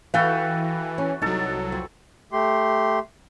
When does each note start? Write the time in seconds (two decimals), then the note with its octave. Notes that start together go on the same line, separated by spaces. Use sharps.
0.14 E3 F#4 A4 B4 F5 G5
0.98 C#4
1.22 C2 F#3 D#4 A4 A5
1.72 F2
2.32 A3 G4 C6